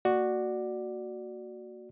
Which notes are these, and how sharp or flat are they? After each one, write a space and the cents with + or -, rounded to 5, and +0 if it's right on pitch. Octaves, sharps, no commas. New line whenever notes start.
A#3 -20 F#4 +0 D5 +10